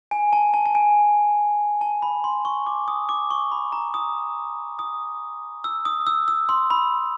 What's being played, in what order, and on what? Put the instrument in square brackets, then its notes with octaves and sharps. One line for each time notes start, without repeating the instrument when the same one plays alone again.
[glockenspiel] G#5
A5
A5
A5
G#5
A5
B5
C6
C#6
D6
D#6
D6
C#6
B5
A#5
D#6
D#6
E6
D#6
E6
E6
C6
B5